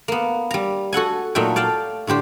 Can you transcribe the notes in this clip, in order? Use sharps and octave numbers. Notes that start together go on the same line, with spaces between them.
A#3 B3
G3 A#5
F#4 A4 F#5 G#5
A#2 F#3 A3 D#4 E5 G5
D5 F5 G5 A5
A2 D3 G4 C5